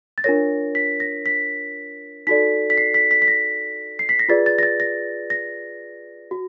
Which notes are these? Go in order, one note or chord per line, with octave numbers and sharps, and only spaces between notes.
A6
D4 F4 A#4 C#5 A#6
B6
A#6
B6
D#4 F#4 A4 D5 B6
B6
C7
B6
B6
B6
A#6
C7
B6
A#6
F4 G#4 B4 D5 A6
A6
A#6
A6
A#6
A#6
F#4